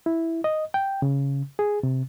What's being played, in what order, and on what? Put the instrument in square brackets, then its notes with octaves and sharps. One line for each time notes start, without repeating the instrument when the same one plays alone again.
[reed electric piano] E4
D#5
G5
C#3
G#4
C3